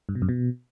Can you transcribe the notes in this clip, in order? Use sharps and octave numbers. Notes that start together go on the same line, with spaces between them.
G2
B2
F#2
B2